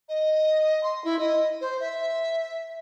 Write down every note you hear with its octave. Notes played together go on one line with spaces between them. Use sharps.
D#5
C6
E4
D#5
C5
E5